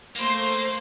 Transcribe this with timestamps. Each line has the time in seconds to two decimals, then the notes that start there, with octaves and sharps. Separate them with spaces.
0.16 A3 A#3 C5 C6